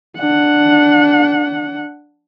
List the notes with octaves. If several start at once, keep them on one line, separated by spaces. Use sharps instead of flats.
D4 F#5